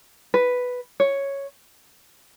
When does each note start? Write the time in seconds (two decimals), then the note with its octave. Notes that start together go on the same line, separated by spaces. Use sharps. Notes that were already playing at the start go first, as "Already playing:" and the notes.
0.34 B4
1.00 C#5